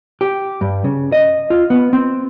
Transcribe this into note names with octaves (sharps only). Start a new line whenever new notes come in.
G4
G2
C#3
D#5
F4
B3
C4